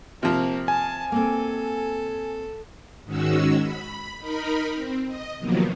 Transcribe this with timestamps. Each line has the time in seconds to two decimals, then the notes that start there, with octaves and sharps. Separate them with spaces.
0.23 C3 F3 A#3 C4
0.68 G#5 A5
1.12 A#3 C4 A4
3.05 G#2 D#3 G#3 C#4 F#4 E6
3.61 B5
4.20 D#4 A#4 B5
4.74 C4
5.07 D#5
5.39 C3 D#3 F3 F#3 A#3 B3